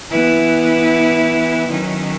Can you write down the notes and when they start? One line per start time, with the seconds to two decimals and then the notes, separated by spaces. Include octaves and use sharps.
0.11 E3 B3 E4 B4
1.67 D#3 F#3 C#4